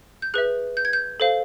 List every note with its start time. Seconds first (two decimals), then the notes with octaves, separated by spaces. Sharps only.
0.22 G6
0.34 G#4 B4 E5 F#6
0.77 G6
0.85 G#6
0.93 G6
1.20 A4 C5 F5